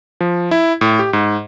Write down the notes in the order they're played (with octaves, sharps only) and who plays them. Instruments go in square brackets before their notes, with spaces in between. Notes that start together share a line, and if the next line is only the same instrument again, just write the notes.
[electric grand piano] F3
E4
A2
G4
G#2